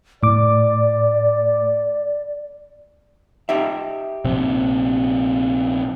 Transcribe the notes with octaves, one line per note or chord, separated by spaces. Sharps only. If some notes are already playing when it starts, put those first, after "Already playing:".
A2 D5 D6
D#4 G4 E5
A#1 C3 C4